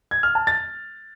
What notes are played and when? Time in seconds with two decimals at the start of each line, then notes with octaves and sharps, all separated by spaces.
0.11 G#6
0.23 F6
0.35 A5
0.47 A6